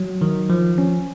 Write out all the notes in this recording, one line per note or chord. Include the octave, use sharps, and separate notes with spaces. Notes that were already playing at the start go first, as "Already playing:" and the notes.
Already playing: F#3
D#3
F3
C#4